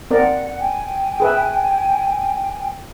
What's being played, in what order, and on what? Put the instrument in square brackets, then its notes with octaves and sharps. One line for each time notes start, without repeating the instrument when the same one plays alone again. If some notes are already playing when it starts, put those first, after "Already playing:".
[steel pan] C4 A#4 D5 [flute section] F#5
[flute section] G5 G#5
[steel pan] G#4 B4 E5